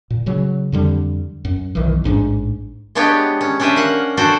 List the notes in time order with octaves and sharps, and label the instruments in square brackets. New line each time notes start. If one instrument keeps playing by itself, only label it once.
[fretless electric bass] A#2
C#3 F#3
F2 D3 G3
F#2
B1 D#3 E3
A1 G#2 D#3 D4
[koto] G#3 B3 D4 G4 C#5 G5
C#4
C#4 D4 G4 B4 C5 E5
A#3 F5 F#5
D4 F#4 A4 C5 G5 G#5